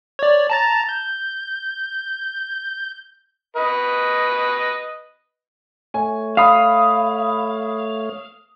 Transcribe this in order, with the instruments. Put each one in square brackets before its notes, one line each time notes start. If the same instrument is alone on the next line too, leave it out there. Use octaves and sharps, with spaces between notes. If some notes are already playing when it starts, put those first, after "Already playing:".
[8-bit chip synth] C#5 D5
A5 A#5 A6
G6
[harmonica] B4 D#5
[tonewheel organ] A3 C#5 [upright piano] G#5
[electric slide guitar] F5 [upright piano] B5 D#6 C7